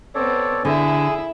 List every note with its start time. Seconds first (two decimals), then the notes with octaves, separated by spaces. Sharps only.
0.15 B3 C4 A4 C#5 D5
0.65 D3 E4 G#4 E5 G#5